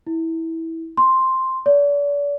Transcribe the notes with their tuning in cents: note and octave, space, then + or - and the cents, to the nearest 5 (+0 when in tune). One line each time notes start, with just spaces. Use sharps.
E4 -15
C6 +5
D5 -40